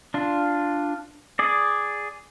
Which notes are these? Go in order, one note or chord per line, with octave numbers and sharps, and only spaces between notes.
D4 F4
G#4 D5